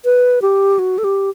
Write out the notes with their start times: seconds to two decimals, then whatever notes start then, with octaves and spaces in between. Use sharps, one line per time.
0.05 B4
0.42 G4
0.79 F#4
0.98 A4
1.04 G4